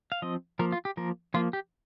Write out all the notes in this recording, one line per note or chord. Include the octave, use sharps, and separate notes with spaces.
F5
F3 C4 D#5
F3 A#3 A#4
F4
G4
F3 A#3 A#4
F3 A#3 F4
G4